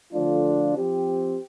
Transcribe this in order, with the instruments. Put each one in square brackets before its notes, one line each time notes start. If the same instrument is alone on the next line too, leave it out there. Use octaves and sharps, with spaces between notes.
[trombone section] D3 F3 A3 D4 F4
F3 C4 G4